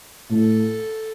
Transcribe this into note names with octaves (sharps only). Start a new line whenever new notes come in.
A2 A4